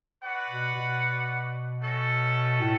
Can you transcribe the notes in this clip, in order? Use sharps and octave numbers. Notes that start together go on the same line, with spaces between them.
F#4 B4 D5 F#5
B2
B2
A3 C#4 F#4 A4
A2